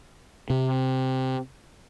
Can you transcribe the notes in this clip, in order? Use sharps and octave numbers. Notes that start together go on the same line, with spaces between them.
C3